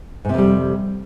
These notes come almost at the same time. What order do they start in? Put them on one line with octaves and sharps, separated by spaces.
G#2 C3 F2 G3